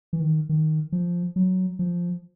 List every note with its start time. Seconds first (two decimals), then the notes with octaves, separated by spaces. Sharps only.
0.13 E3
0.20 D#3
0.49 D#3
0.92 F3
1.36 F#3
1.79 F3